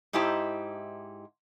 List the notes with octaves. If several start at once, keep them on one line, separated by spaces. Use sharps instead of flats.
G#2 D#4 E4 G4 C5 A5